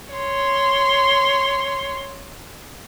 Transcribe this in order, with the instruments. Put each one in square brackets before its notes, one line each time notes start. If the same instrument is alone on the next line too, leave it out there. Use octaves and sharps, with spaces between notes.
[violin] C#5 C6